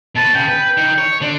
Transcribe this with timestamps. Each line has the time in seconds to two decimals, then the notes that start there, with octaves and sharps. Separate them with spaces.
0.16 B2 B4 A5
0.35 C#3 G5
0.49 B4
0.77 D#3
0.98 C#5
1.22 D3 D4